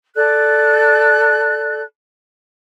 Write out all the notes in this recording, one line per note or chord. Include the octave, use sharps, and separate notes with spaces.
A4 D5 F#6